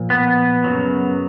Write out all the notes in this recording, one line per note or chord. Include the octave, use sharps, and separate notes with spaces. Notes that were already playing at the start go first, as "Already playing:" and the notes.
Already playing: A#2 F3
B3
F#2 C#3 F#3